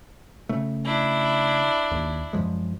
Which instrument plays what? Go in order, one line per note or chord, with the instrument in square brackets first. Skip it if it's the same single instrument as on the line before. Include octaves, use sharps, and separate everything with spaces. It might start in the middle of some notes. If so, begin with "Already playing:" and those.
[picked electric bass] C#3 A3
[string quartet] D4 E4
[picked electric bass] D#2
F#2 F3 G#3